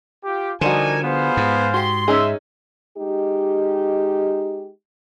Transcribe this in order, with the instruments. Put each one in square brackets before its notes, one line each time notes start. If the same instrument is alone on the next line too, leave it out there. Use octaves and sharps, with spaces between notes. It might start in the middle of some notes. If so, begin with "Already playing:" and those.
[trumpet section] F4 G4
[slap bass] D3 [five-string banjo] F3 G3 F#4 [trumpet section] D4 D#4 [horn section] A#4 G#5
[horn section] B3 [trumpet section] G#4 C5 F5
[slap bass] G#2
[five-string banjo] F#4 G4 [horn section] C6
[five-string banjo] C#4 D#4 G#4 [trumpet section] E5
[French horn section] G#3 D#4 G4